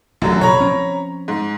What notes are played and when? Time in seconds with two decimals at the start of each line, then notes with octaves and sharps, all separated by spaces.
0.22 A1 F#2 D3 F#3
0.41 A#1 C3 F3 C#5 A#5 B5
0.60 F3 C4 C#4
1.28 G#2